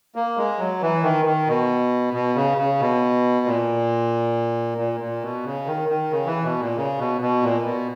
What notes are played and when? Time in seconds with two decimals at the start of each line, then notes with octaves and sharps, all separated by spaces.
0.15 A#3
0.37 G#3
0.59 F#3
0.82 E3
1.03 D#3
1.25 D#3
1.48 B2
2.14 B2
2.36 C#3
2.58 C#3
2.80 B2
3.46 A#2
4.78 A#2
5.00 A#2
5.22 B2
5.45 C#3
5.67 D#3
5.89 D#3
6.11 C#3
6.27 E3
6.43 B2
6.60 A#2
6.77 C#3
6.98 B2
7.21 B2
7.43 A#2
7.64 B2